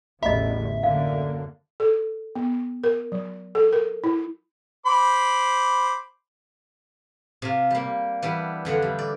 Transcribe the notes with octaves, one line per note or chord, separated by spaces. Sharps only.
A1 E2 D3 D#5 E5 B5
F#2 D3 A#3 F5
A4
B3
A#4
F#3
A4
A#4
E4
C5 B5 D6
C3 F4
G3 A#3
E3 G3 B3 D4
F2 D3 E3 F#5
G3
D5